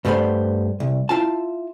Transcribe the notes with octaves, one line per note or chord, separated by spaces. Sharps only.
G2 G3 A3 B3 C5 B5
C2
E4 F4 A5